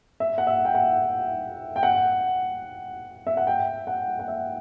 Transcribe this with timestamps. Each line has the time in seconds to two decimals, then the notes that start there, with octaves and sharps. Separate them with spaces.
0.20 E5
0.38 F#5
0.47 E5
0.65 G5
0.75 F#5
1.76 G5
1.83 F#5
3.27 E5
3.37 F#5
3.47 G5
3.87 F#5
4.19 F#5
4.28 E5